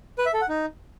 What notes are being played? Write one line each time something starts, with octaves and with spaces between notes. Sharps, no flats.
B4
E5
A4
F#5
D#4